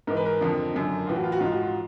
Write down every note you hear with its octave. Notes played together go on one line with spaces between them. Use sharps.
G#2 E3 A#4
B4
A#4
F2 D3 F3
F#2 D3 F3
A2 E3 F4
F#4
F4
F#4
G#2 F3 F4
F#4
F4